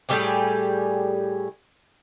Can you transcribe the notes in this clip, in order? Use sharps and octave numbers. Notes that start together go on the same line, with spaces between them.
A2 G3 G4 G#4